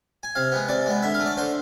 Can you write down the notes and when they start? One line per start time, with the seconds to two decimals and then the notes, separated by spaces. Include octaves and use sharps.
0.23 G#5
0.35 C3 F5
0.52 G#3 B3
0.69 C3 D5
0.86 G#3 B3
1.03 D3 E5
1.14 F5
1.20 A3
1.26 D5
1.37 D3 C5